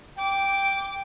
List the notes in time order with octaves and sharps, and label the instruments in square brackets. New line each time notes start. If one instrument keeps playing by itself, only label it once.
[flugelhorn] G5 [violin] D6